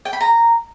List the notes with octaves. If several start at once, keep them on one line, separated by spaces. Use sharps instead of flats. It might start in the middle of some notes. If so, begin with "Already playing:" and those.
G5
B5
A#5